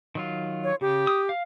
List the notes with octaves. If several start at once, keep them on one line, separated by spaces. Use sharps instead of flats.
D#3 F#3 F4
C#5
C#3 G4
D#6
F5